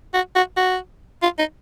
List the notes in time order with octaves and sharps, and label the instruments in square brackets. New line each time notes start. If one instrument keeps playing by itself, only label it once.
[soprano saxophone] F#4
F#4
F#4
F4
D#4